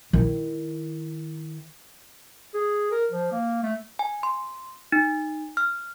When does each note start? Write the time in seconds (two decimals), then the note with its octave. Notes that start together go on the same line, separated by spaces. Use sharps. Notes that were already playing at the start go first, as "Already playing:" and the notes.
0.13 D#3 E4
2.55 G#4
2.92 A#4
3.12 F3
3.32 A#3
3.63 A3
3.99 G#5
4.23 C6
4.92 D#4
5.57 F6